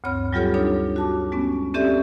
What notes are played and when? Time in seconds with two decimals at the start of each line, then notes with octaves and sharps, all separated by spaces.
0.04 D2 G2 C4 C#5 B5 F6
0.33 F#3 G3 F4 G4 A4 C#5
0.54 D4 D#4 A4 C#5
0.96 F#4 A5 D6
1.32 G#3 B3 C#4
1.74 C4 C#4 G4 A4 D5 E5